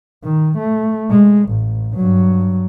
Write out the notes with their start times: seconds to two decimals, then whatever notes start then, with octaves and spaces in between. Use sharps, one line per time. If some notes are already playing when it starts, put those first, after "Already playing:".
0.24 D#3
0.57 A3
1.11 G#3
1.49 A1
1.95 G2 F#3